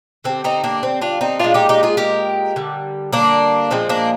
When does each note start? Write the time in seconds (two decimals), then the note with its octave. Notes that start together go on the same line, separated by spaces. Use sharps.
0.24 D3 G3 C4
0.44 C4 D#4
0.64 A#3 D4
0.83 C4
1.01 D4 F4
1.21 C4 D#4
1.39 A#2 G#3 D4 F4
1.54 D#4 G4
1.69 D#4 G4
1.83 F4 G#4
1.97 G4 A#4
2.56 D3 G3
3.13 A#3 D4
3.71 A#2 F3 G#3 C4
3.89 A#3 D4